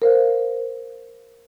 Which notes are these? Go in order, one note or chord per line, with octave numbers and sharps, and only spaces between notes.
A#4 C5 F5